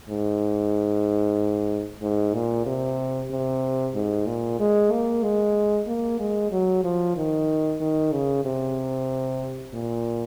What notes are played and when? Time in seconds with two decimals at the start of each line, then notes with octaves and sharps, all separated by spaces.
0.09 G#2
2.02 G#2
2.34 A#2
2.66 C3
3.31 C3
3.95 G#2
4.26 A#2
4.60 G#3
4.92 A#3
5.23 G#3
5.87 A#3
6.20 G#3
6.51 F#3
6.84 F3
7.17 D#3
7.81 D#3
8.13 C#3
8.45 C3
9.73 A#2